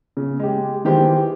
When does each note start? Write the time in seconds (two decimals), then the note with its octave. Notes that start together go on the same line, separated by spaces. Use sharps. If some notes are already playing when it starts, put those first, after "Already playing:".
0.17 C#3
0.39 G#3 G4
0.85 D#3 E3 G4 G#4 C5